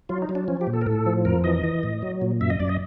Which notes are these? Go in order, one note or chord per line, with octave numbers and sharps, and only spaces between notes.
F#3 F4
D#4
F#3
D4
F3 C#4
G4
A#2
A4
A#4
A2 A4
F3
F2 A#4
E3 D#5
E3
A2
F#3
A#2
F#2 E5
D#5
F#2 D5
D#5